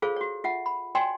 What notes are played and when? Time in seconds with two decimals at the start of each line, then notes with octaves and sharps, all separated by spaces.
0.02 F4 G#4 A4 C5 C#5 F5
0.16 F#4 C#5
0.44 F4 E5 F#5
0.66 B5
0.95 F#4 C#5 D5 G5 G#5 C6